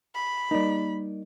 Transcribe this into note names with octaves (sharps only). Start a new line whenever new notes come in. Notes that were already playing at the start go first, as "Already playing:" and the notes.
B5
G3 A#3 D#4 D5